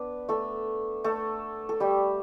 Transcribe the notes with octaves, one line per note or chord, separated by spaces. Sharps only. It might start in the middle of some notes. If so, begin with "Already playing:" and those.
Already playing: B3 D4 B4
A3 A4
A3 A4
A4
G3 G4